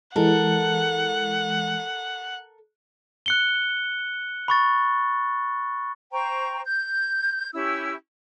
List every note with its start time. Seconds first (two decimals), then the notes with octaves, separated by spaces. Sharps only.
0.16 E3 G#3 A4 A#4 F#5
3.26 F#6 C#7 G7
4.48 B5 C#6 A6
6.12 C5 G5 A#5 C#6
6.65 G6
7.53 C#4 E4 G4 E6